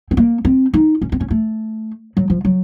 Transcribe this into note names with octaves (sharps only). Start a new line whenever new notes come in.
C4
A#3
C4
D#4
C#4
C4
C#4
A3
F#3
F3
F#3